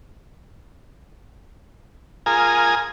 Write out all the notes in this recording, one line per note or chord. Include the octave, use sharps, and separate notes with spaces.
F4 G#4 A#4 G#5 A#5 D#6